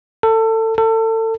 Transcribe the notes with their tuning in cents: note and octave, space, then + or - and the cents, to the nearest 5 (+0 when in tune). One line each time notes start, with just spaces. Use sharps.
A4 +25
A4 +30